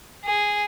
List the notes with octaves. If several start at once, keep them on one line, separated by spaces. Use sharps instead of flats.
G#4